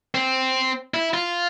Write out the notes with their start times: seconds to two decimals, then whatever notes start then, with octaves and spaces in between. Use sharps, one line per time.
0.15 C4
0.94 E4
1.14 F4